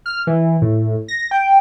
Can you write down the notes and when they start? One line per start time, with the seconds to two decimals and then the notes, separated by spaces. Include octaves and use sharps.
0.06 F6
0.27 E3
0.62 A2
1.08 A#6
1.31 G5